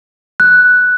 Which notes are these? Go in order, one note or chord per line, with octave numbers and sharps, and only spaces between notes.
F#6